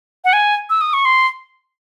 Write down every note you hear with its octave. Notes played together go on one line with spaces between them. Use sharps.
F#5
G#5
E6
D#6
C#6
C6